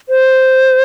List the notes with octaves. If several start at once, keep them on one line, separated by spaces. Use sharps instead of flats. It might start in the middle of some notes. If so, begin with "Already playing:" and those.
C5